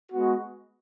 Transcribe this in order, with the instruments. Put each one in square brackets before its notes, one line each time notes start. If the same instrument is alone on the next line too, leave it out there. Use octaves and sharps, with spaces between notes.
[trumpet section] G#3 B3 F#4